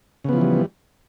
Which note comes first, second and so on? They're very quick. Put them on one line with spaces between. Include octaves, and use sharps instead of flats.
C#3 B3 F3 E3 G3